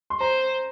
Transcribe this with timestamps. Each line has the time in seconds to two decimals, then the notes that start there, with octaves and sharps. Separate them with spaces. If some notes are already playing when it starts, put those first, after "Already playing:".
0.10 C6
0.20 C5 A#5